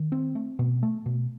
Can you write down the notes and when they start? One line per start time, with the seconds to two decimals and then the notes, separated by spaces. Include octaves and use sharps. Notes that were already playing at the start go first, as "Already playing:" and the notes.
Already playing: D#3
0.12 C4
0.35 A3
0.59 B2
0.83 A3
1.06 B2